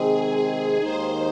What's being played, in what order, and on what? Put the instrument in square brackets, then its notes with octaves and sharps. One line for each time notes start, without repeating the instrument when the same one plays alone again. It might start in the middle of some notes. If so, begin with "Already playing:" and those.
Already playing: [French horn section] C3 D#3 G#3 C4 [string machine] G#4
[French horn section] D#2 D#3 G#3 D#4 [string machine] C5